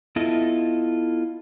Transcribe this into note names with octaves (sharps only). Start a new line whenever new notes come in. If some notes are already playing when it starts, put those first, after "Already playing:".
B3 E4 F4 A4 D#5 E5